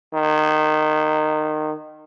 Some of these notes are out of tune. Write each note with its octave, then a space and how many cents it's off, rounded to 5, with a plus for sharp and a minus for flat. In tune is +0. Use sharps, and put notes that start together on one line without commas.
D#3 -20